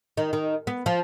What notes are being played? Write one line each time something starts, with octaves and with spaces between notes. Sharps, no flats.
D#3
D#3
B3
F3